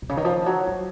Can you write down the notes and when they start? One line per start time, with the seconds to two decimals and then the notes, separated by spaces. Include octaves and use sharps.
0.02 B2
0.09 C#3
0.17 D#3
0.25 F3
0.46 F#3
0.67 F#3